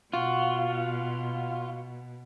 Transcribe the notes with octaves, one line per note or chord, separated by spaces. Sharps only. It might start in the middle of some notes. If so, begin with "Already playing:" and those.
B2 F4 F#4